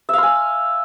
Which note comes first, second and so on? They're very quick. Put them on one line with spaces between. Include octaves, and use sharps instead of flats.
E5 F5 C6 G#5